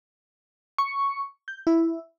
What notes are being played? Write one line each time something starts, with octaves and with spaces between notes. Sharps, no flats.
C#6
G6
E4